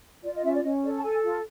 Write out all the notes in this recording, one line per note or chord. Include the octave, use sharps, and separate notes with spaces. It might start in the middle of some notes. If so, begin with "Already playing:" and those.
F4 D5
D#5
C#4 E5
D5
C#4 D#5
A4 D5
A5
A4 G#5
F4